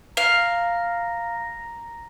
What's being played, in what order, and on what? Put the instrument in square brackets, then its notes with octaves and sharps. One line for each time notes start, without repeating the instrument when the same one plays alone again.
[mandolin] F5 F6 [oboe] A#5